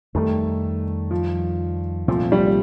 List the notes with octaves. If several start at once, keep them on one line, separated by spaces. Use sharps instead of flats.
F2 D#3 G3 A3
F3
C2 A#2 F3 A3 C4
G3